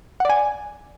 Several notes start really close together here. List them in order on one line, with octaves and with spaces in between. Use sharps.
F#5 D5 G#5